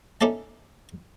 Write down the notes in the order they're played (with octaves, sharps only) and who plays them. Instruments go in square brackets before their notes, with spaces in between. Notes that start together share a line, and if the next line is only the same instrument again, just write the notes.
[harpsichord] C#4 D#4 A4 D5 E5 A5